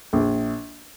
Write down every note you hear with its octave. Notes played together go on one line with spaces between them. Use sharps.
A#1